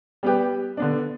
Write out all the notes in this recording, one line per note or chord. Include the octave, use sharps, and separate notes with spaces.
G3 B3 G4 B4
D3 B3 D4